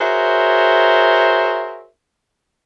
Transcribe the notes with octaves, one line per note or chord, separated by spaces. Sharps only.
F#4 G#4 A#4 C5 C#5 E5